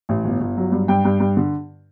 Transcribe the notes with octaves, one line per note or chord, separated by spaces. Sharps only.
A1
G1
G1
F#3
G2
G2 G5
G2
G2
D3